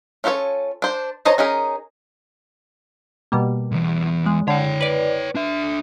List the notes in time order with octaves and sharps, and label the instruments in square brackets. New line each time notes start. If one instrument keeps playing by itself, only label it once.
[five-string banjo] C#4 F4 A4 C5 C#5
D4 C5
C5 C#5 D#5 A5 A#5
C#4 D#4 G#4 A#4
[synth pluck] B2 G3 A#3
[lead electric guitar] B1 E2
[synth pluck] G#3
[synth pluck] D3 [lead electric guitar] C#5 G5
[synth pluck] B4 D5
[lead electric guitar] D4 E5